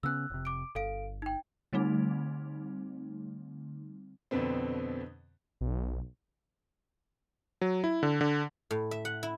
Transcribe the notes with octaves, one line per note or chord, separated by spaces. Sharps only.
C#3 B3 C#4 E6 F#6
F1 C3
D6 D7
G1 A4 F5 D7
D#4 G5
D3 G3 A3 C4 D#4
F2 B2 D3 B3 C4
B1
F#3
E4
D3
D3
A2
E5
F#5
E4